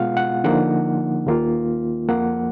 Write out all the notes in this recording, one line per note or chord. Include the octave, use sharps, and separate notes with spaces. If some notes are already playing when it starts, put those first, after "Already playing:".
Already playing: B2 G#3 B3 F4 F5 F#5
F#5
D3 F3 A#3 D#4 F#5
D#2 D#3 A#3 F4
F2 F3 A#3 F#5